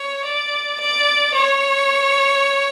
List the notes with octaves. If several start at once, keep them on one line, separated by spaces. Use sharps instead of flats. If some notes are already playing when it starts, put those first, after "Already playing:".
Already playing: C#5
D5
D5
C#5